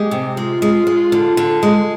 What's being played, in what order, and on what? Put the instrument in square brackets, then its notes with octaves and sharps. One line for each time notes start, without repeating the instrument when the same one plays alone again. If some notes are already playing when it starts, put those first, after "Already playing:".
Already playing: [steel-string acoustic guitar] G#3 [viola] G4
[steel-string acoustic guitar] C3
[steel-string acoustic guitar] G#3 [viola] F4
[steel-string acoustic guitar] G#3
G#3
D3
D3
G#3